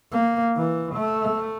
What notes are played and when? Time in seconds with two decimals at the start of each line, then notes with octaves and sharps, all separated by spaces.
0.12 A#3
0.57 E3
0.95 A3